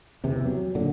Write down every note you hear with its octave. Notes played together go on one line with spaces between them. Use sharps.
E2 C3 E3
F#3
A#2 D3